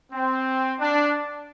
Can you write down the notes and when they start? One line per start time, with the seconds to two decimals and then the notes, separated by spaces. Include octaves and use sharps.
0.13 C4
0.80 D4